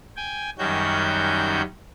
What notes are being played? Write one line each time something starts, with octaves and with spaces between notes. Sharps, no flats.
G5 G#5
F#2 D#3 G3 C#4 F#4 G6